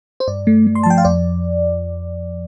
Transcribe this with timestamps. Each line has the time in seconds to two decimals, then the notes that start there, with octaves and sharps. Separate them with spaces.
0.20 C5
0.28 G2 D5
0.47 A3
0.67 A3
0.75 C6
0.83 A5
0.86 F3 G5
0.98 F5
1.05 F2 D5